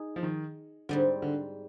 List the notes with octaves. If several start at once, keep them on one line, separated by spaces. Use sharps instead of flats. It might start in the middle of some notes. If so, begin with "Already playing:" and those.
Already playing: D#4 G#4
F3
D#3
G#2 D3 G3 C4
D3